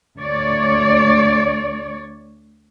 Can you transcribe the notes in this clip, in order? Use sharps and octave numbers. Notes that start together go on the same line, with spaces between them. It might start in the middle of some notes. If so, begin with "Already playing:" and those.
D2 C#5 D5